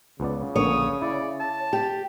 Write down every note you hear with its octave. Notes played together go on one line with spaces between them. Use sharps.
C#2 C#3 B3 D5
A#1 D3 A#3 C#5 D#6
E4 D5
A5
G4